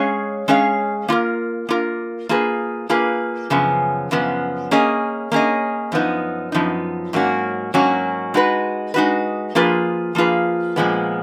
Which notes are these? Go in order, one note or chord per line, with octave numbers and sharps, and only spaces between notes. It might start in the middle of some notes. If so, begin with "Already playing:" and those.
Already playing: G#3 C#4 G#4 C#5 F5
G#3 C#4 G#4 C#5 F5
A#3 F4 A#4
A#3 F4 A#4
A#3 F4 G#4 B4
A#3 F4 G#4 B4
F#2 C#3 F3 B3
F#2 C#3 F3 B3
A#3 C#4 G#4 D#5
A#3 C#4 G#4 D#5
F#2 F3 B3 D#4
F#2 F3 B3 D#4
G#2 F#3 A#3 C#4 F#4
G#2 F#3 A#3 C#4 F#4
G#3 D#4 F#4 B4
G#3 D#4 F#4 B4
F3 A#3 F4 G#4 B4
F3 A#3 F4 G#4 B4
A#2 F3 G#3 B3